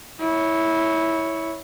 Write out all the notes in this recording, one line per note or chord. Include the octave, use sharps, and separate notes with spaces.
E4 C#5